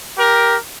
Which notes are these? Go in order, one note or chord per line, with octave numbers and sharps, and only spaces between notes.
G4 A#4